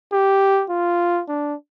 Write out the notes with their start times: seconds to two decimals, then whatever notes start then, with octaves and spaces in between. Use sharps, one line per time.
0.13 G4
0.70 F4
1.28 D4